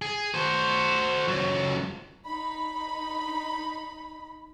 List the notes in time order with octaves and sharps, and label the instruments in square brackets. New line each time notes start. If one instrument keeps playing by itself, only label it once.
[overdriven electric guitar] G#4
F#4 C5
C#2 F#3
[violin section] D#4 B5